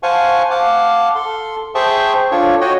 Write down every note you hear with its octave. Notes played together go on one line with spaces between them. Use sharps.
C5 F5 F#5 G#5 A5 C#6
F5 F#5 A5 D6
A4 C6
G#4 C5 E5 G5 A5 C#6
D4 F4 A4 C#5 D5 C#6
F#4 C#5 D#5 F#5 G5